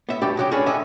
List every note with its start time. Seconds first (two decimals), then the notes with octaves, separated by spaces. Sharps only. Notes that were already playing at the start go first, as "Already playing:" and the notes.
0.09 B3 E5
0.22 F#2 D4 G4 B4
0.37 C#3 F#3 G4
0.52 C#4 D4 G#4 B4
0.66 D3 D#3 E5 G#5